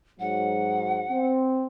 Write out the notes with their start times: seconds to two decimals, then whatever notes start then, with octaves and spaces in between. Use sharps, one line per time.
0.20 G#2 F#3 F#5
1.10 C4